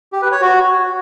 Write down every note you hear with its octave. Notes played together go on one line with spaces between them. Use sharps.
G4
B4
C#5
F#4